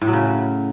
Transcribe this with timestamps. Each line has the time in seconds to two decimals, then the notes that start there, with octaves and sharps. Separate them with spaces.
0.01 A2
0.07 F#3
0.13 C#3